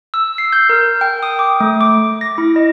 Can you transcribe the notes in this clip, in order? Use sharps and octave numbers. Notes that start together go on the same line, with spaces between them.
E6
C7
G6
A#4
G5
D#6
D6
A3
D6
A#6
E4
D#5